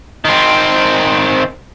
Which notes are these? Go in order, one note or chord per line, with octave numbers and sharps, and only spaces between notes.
D#3 C4